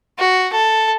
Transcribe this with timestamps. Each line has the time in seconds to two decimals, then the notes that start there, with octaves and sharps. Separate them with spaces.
0.19 F#4
0.52 A4